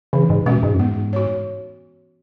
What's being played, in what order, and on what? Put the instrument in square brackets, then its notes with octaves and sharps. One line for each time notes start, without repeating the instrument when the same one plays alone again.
[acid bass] C#3 [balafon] E3
[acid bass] G#2
[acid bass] B2 [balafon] G#3 C#4 F#4
[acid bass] G#2
F#2
[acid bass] G#2 [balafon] B3
[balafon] F#4 C#5